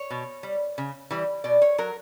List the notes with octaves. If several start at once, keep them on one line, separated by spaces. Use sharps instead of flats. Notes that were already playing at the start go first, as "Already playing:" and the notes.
Already playing: C#5
B2
G3
C#3
E3 G3
B2 D5
C#5
F#3 A#4